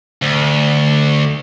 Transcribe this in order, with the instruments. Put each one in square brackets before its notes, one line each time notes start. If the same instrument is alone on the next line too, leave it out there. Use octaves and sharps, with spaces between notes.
[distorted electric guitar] D2